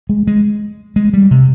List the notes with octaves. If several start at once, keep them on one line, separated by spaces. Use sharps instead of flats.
G#3
G#3
G#3
G3
C3